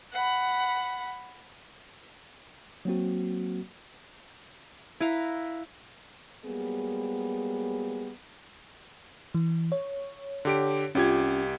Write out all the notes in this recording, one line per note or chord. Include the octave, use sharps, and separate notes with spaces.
F#5 B5
F#3 A#3 C4 F#4
E4 B4 F5 A#5
F#3 G3 A#3 B3 G#4
E3
C#5
D3 G4 D7
C2 C#4 F4 G4 G#6